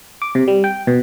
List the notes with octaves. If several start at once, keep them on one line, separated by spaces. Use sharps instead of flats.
D6
C3
G3
G5
B2